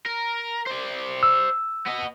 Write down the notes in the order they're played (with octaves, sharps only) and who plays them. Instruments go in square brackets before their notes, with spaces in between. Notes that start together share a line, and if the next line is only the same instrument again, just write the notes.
[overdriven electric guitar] A#4
C5 D5
[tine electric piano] E6
[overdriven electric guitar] B3 D#5